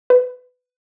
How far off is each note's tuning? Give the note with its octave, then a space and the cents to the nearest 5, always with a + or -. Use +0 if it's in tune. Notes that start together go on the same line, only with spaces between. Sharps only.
B4 +20